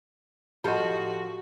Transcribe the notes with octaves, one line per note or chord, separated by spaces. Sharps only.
A2 F3 F#4 G4 A4 D#5